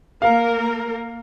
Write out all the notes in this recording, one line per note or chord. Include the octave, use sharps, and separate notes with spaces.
A#3 A#4 F5